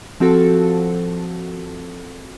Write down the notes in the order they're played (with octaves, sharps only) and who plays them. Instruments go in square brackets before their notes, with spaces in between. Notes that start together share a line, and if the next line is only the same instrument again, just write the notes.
[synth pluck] F3 C4 F#4 A4